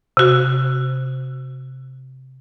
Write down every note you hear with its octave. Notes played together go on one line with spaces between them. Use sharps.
C3 F#4